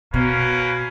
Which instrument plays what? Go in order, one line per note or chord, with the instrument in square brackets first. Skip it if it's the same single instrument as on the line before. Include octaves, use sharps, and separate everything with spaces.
[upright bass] B2 [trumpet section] A#3 C#4 B4